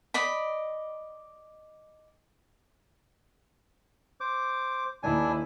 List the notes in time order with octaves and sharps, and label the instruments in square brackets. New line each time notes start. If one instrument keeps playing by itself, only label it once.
[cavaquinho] D5 D#5 B5
[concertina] C5 D6
[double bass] D#2 E4 [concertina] D4 G#5